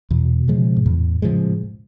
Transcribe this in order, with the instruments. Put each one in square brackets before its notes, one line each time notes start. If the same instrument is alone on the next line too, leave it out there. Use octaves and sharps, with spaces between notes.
[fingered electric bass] E2 [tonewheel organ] B2
[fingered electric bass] C#3 F3 G#3
[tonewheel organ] G#2
[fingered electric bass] E2 [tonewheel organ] A2
[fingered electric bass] C#3 F3 G#3